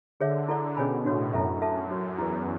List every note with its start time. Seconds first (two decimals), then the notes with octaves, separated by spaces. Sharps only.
0.20 D3 G#4 C#5 E5
0.48 D3 E4 A4 D5
0.77 B2 C#4 G#4 C#5 G#5 B5
1.05 A2 D4 F#4 C#5
1.33 F#2 C#4 E4 A4 E5
1.62 A4 E5 A5
1.90 C#4 F#4 C#5
2.18 E2 E4 G#4 B4